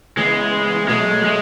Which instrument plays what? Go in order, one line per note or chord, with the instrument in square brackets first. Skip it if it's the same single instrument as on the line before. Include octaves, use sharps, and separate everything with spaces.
[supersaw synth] C#3 E3 B3 [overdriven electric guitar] G#3
[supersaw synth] B2 F#3 A3 [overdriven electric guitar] G#3
[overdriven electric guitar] G#3